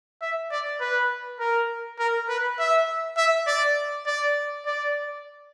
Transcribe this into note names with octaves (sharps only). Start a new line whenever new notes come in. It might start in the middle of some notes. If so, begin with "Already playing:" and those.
E5
D5
B4
A#4
A#4
B4
E5
E5
D5
D5
D5